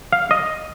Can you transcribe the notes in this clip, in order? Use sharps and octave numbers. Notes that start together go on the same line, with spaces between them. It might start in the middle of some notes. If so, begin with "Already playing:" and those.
F5
D#5